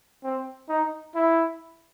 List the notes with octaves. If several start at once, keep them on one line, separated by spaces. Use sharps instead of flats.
C4
D#4
E4